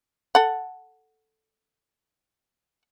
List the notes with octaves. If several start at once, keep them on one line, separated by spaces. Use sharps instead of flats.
A4 F#5